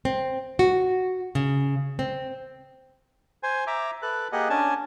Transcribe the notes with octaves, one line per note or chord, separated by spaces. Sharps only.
C4
F#4
C#3
C4
C5 G#5
E5 A#5 D6
A4 B4 F#6
A#3 G4 G#4 D#5 F#5
C#4 D4 G#5 A5